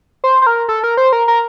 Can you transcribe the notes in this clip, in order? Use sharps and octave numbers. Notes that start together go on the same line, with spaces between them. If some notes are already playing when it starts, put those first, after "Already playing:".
C5
C5
A#4
A4
A#4
C5
A#4
A#4